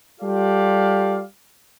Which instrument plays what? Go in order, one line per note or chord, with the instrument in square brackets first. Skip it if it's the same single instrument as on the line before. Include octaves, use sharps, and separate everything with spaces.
[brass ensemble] G3 F4 G4 A4 D5 F5